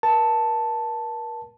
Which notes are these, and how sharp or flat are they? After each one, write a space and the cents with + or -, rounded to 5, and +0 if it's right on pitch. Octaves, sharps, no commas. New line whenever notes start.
A#4 +40 A5 +0